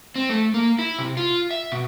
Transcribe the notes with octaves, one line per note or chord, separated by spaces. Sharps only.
C4
A3
A#3
E4
C3
F4
E5
B2